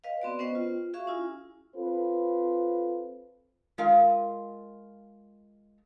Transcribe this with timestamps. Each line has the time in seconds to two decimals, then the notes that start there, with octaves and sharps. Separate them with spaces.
0.04 B4 D#5 F5
0.22 B3 C4 F#4 D5
0.39 B3 C#4 B4 C5 D#5 G5
0.55 F4
0.94 F#4 G#4 E5 F5 C#6
1.07 C#4 E4 F4 G#5
1.76 C4 F4 A4 B4
3.78 G#3 F4 A#4 F5